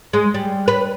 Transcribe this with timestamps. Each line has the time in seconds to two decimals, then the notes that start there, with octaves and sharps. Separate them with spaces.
0.13 G#3
0.34 G3
0.68 B4